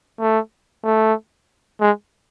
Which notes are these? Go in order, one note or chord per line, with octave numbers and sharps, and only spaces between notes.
A3
A3
G#3